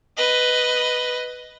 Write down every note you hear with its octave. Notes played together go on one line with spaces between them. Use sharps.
B4 D#5